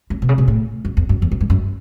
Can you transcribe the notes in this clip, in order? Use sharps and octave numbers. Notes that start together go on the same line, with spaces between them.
F#2
B2
C#3
B2
A2
F#2
E2
F#2
E2
F#2
G2
F#2